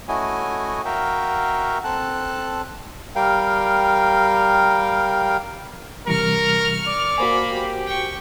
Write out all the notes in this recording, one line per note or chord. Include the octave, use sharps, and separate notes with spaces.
A3 C#4 E4 F#4 D#5 G#5
F#4 A#4 E5 F5 G5
C4 A4 A5 F#6
G3 A#4 F5 G5
C3 E3 G3 A#4 C#6 F6
D5
A#3 F#4 C5 G#5 B5
G4
G5 C#6